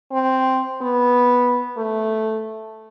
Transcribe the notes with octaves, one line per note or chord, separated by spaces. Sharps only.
C4
B3
A3